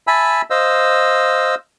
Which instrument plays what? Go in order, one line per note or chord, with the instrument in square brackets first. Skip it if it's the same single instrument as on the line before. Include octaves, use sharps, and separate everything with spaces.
[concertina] E5 G#5 A5 B5 E6
C5 D#5 F5 E6